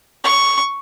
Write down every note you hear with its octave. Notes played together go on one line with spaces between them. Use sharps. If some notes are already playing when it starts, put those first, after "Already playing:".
C#6